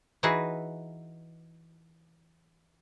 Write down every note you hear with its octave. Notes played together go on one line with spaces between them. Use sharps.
E3 D#4 E4 F#4 G#4 B4